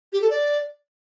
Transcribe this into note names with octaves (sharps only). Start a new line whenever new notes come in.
G4
A4
D5